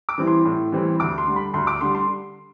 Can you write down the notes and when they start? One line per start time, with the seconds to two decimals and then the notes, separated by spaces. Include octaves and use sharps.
0.09 D6
0.18 E3 G3 C4 E4
0.27 C6
0.45 A2
0.72 E3 G3 C4 E4
1.00 D2 D6
1.18 C6
1.26 D3 G3
1.36 B5
1.54 D2 C6
1.67 D6
1.81 D3 G3 C6
1.95 C6